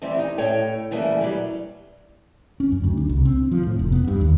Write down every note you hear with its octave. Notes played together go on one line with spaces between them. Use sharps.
D2 E3 G3 C4 G4 E5
D#4
A2 C#5 G5
C#3 E3 G3 A3 A#3
F#3 G3
C#4
F#2
D2
D4
C2
C4
F3
A2
F1
B3
G2
D#2